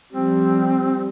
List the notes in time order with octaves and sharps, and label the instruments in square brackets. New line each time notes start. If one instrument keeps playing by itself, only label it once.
[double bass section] F3 G3 [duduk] C4